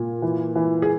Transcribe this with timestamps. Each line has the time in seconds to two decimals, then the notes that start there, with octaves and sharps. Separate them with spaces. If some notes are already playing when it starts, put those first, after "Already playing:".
Already playing: A#2
0.22 E3
0.55 E3
0.82 G#4